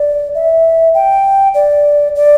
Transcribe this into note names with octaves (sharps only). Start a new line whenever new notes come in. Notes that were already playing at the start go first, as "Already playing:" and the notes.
Already playing: D5
E5
G5
D5
D5